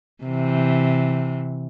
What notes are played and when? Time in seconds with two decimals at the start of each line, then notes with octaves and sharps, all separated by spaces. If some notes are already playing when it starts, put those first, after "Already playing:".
0.24 C3 E3